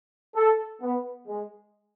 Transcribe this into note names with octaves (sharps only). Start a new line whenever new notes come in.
A4
B3
G#3